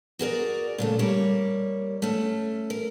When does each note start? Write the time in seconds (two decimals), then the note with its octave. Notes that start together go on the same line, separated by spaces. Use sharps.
0.19 F#4 G#4 A#4 D5
0.78 A#2 C#3 A3
0.99 G3 A#3 C#5
2.02 A3 C#4
2.70 A#4